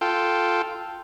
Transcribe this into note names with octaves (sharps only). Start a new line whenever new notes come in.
F4 A4 G5